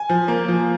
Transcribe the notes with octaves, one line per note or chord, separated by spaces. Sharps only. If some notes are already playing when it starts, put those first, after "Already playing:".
Already playing: G#5
F3
A#3
F3